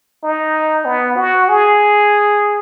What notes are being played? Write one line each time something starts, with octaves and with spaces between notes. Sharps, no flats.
D#4
B3
F#4
G#4